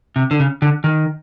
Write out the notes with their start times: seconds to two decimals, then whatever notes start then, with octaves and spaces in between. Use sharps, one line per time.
0.16 C3
0.31 D3
0.40 C#3
0.62 D3
0.84 D#3